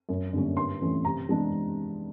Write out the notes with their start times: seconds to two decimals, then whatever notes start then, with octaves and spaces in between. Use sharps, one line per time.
0.09 F#2
0.33 D3 G3 A#3 C#4
0.57 G2 C6
0.81 E3 A3 C#4
1.05 C3 A#5
1.28 E3 G#3 B3 D4